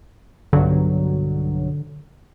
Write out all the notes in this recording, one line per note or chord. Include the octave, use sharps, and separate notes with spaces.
B1 G2 D3 F#3